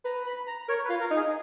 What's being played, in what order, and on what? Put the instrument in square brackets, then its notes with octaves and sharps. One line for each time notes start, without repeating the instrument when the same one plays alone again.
[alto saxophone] B4 [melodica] A#5
[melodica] B5
A#5
[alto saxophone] A#4 [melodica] C#5
[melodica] B4
[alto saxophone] F4
[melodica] A#4
[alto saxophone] D#4
[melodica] G#4